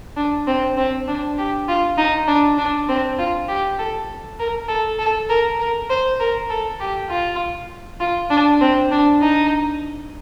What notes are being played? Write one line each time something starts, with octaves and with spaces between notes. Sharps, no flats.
D4
C4
C4
D4
G4
F4
D#4
D4
D4
C4
F4
G4
A4
A#4
A4
A4
A#4
A#4
C5
A#4
A4
G4
F4
F4
D4
C4
D4
D#4